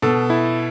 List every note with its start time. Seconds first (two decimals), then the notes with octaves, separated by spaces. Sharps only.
0.02 B2 A4
0.30 E4